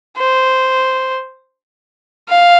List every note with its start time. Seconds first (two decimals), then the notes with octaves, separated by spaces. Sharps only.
0.18 C5
2.29 F5